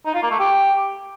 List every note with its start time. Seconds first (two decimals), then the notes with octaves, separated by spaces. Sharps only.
0.06 D#4
0.15 F4
0.23 A#3
0.31 A3
0.39 G4